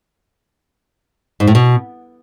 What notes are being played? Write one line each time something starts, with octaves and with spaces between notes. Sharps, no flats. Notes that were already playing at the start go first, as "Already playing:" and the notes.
G#2
A2
B2